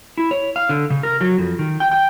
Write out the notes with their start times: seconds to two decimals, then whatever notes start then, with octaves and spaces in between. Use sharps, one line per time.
0.18 E4
0.31 C#5
0.56 F5
0.69 D3
0.90 C#3
1.03 A#4
1.21 F#3
1.38 F2
1.59 D#3
1.80 G5
1.91 G5